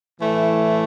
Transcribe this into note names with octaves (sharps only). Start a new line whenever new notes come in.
A2 E3 A3